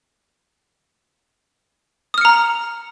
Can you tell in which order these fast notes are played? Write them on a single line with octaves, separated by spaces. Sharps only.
D#6 F6 C#7 A#5